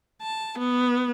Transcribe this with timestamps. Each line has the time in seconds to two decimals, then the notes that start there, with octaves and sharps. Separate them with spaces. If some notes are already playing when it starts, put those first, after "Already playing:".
0.22 A5
0.59 B3